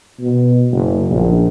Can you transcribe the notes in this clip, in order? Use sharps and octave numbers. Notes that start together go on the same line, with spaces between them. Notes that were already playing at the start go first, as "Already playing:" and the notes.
B2
F#1
A#1